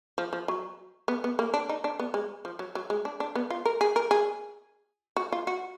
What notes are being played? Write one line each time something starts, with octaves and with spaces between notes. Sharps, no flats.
F3
F3
F#3
B3
B3
A#3
D4
D#4
D4
B3
G#3
F3
F#3
F#3
G#3
D4
D4
B3
F4
A#4
G#4
A#4
G#4
F#4
F4
F#4